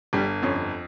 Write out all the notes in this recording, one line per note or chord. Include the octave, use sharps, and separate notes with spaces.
G1 G3
F2 C#4